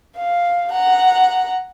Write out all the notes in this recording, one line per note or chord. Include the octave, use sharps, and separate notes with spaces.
F5
F#5 A#5